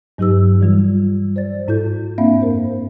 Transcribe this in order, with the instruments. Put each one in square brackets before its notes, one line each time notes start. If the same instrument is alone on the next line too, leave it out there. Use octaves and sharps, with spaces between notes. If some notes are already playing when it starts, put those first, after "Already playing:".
[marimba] G2 F#3 D#4 G4 B4 E6
E3 G3 F4
C5 D5 A6
G#2 E4 A4 G6
A#3 C4 D4 E5 F5 B5
F#2 A#4 C5